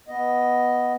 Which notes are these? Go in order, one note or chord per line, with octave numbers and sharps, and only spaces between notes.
B3 D#5